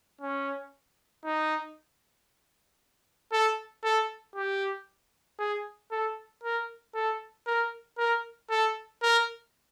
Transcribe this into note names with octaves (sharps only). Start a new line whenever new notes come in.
C#4
D#4
A4
A4
G4
G#4
A4
A#4
A4
A#4
A#4
A4
A#4